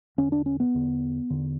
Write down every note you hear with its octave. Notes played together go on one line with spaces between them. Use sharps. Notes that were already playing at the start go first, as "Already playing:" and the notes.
E2 D3 C#4
D4
C#4
B3
E2 D3
E2 D3